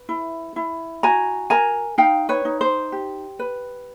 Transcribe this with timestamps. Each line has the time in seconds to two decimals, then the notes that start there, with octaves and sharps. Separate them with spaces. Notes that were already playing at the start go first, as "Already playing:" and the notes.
Already playing: B4
0.09 E4
0.56 E4
1.03 F#4 G#5 A#5
1.50 A#4 G#5 A#5
1.98 D#4 F5 G5
2.29 B4 C#5
2.45 D#4
2.61 C5
2.92 G4
3.39 B4